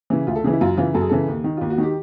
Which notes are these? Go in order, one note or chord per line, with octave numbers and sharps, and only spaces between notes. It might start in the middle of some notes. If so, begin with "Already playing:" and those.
C#3 E3
D2 F4
A4
C#3 E3 G#4
E4
F#2 F4
C#3 E3 F4
F#2 A4
G#4
C#3 E3 A4
D#2
D#3
D#2 F4
F#4
D#3 G4